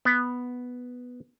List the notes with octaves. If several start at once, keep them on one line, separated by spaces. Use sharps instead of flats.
B3